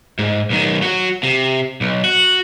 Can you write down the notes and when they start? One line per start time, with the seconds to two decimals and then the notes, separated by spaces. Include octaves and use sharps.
0.19 G#2
0.50 B1 D#3
0.82 F#3 F#4
1.23 C3
1.81 B1
2.04 F#4